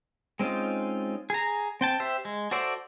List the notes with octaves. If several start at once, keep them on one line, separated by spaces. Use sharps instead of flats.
G#3 C4 C#4 D#4 F4
G#4 A#5
C4 G5 A5
G4 C5 E5
G#3
F#4 A4 C5 D5 E5